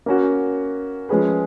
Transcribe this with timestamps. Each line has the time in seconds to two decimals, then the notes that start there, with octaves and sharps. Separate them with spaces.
0.06 A#3 C#4 F#4
1.09 F3 G#3 C#4 G#4 B4